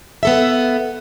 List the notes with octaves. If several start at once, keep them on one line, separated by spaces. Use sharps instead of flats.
B3 A4 E5